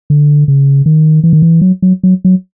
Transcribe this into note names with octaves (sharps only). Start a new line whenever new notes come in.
D3
C#3
D#3
E3
D#3
E3
F#3
F#3
F#3
F#3